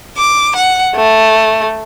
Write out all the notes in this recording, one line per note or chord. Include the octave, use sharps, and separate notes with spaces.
D6
F#5
A3